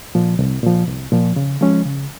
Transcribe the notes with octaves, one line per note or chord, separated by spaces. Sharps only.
A#2 F3
C2
A#2 F3
C2
A#2 F3
C#3
F3 G#3 C#4
C#3